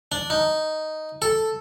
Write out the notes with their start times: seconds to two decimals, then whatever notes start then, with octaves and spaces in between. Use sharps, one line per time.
0.12 D4
0.30 D#4
1.22 A4